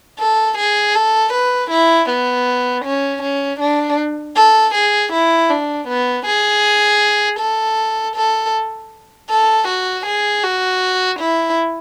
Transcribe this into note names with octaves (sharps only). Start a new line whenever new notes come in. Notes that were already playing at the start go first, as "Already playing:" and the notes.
A4
G#4
A4
B4
E4
B3
C#4
C#4
D4
A4
G#4
E4
D4
B3
G#4
A4
A4
A4
F#4
G#4
F#4
E4